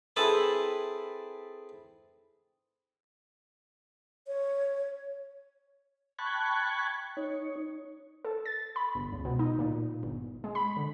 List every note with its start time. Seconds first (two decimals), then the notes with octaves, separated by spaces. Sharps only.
0.16 C4 E4 G#4 A4 B4 A5
4.27 C#5
6.19 G5 A5 B5 C#6 F#6 G#6
7.17 D#4 C#5
8.25 A4
8.46 A6
8.76 B5
8.95 G1
9.12 C#2
9.25 B2
9.39 D#4
9.59 A#2
10.03 G1
10.44 G#3
10.55 B5
10.77 D3